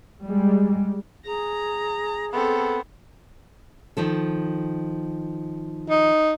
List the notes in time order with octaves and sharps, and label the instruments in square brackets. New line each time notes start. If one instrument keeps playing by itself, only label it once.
[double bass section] G3 G#3
[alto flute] G#4 [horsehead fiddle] A#5
[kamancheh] B3 C4 [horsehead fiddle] A4
[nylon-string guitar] D#3 F3 A4
[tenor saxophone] D#4